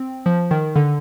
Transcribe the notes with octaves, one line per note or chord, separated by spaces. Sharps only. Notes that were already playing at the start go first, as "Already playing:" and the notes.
Already playing: C4
F3
D#3
D3